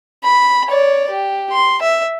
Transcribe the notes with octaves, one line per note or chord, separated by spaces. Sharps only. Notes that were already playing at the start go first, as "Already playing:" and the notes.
B5
C#5 D5
G4
C6
E5